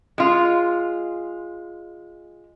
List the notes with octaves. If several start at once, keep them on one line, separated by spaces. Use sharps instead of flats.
G#3 F4